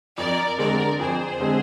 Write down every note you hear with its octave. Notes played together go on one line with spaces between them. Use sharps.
F2 A#4 D5
D3 G#3 C4 A#4 D5
F2 G#4 C5
D3 G#3 C4